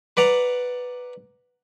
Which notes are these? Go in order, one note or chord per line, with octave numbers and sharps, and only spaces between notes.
B4 D5 F#5 A#5